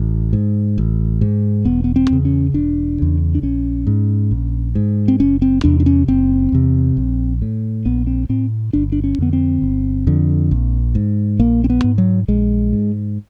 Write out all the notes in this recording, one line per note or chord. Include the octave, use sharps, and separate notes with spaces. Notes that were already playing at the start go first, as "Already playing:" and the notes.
Already playing: A1
G#2
A1
G#2
E1 B3
B3
C4
E2 C#3
C#4
E1 D4
E2 C#3
D4
A#1 C#4
G#2
A#1
G#2
C4
F#1 C#4
C4
E2 C3 D4
D4
C#4
F#1 C4
E2 C3
A#1
A2
A#1 B3
C4
A2 C4
G1 D4
D4
C#4
F2 D3 B3
C4
G1
F2 D3
A#1
G#2
A#1 A#3
C4
B3
G#2
F#3
A#1 G#3
G#2